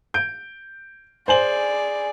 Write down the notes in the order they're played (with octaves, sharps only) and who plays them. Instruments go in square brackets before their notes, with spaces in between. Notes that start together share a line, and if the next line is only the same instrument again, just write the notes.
[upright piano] G6 D7
[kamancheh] G#4 D5 [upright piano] C5 G#5 F#7